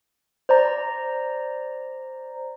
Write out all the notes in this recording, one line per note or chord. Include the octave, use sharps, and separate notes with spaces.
C5 D5 A#5